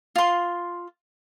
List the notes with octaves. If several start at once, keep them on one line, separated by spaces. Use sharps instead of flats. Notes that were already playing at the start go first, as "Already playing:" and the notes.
F4 C6